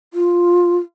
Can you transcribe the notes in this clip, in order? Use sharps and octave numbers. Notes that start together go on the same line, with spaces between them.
F4